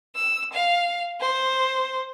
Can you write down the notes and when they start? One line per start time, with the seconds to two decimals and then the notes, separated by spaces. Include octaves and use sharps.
0.15 E6
0.54 F5
1.21 C5